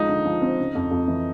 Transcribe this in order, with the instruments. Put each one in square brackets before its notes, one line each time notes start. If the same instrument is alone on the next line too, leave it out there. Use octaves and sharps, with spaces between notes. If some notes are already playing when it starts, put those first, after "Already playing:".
Already playing: [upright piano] C#2 F3 [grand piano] D#4
[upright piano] D3
F3
C4
C#3
F2
F2
E3